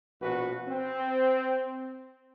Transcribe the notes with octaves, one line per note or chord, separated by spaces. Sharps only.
A#1 B2 F#4 B4
C4